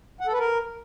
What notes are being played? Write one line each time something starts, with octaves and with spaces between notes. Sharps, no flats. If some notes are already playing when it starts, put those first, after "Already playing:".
F#5
A4
B4
A#4